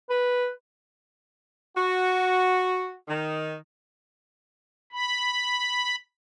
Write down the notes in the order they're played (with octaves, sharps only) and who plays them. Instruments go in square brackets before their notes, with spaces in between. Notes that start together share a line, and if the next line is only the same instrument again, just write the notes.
[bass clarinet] B4
[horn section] F#4
D#3
[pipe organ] B5